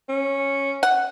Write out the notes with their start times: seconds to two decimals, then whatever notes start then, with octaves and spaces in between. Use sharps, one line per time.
0.09 C#4
0.83 F#5